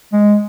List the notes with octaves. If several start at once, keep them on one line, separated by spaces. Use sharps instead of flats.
G#3